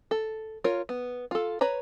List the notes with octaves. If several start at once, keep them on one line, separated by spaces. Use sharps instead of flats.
A4
F4 A#4 C#5
B3
F4 A4
B4 C#5 A#5